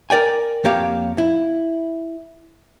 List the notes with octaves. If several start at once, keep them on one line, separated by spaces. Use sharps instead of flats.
A#4 D5 G5 G#5
F2 A#3 G4 C#5 F5
E4